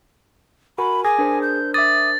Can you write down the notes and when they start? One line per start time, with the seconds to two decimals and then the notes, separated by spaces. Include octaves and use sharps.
0.78 F#4 A#4 G#5 B5
1.05 G#4 G#5 D6 G#6 A#6
1.18 D4 A#4 C5
1.42 G6
1.74 E5 D6 D#6 A6